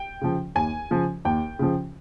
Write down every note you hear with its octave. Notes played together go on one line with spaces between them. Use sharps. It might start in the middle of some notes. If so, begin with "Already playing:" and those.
Already playing: G5
C#3 F3
D#2 G#5
C#3 F3
D#2 G5
C#3 F3